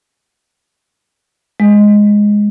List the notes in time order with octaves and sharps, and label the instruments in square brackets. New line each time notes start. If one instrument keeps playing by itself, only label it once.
[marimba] G#3